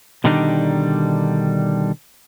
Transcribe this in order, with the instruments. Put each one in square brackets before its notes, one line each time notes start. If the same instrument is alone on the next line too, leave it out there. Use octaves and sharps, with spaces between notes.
[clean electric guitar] B2 D3 D#3 G3 D4 D#4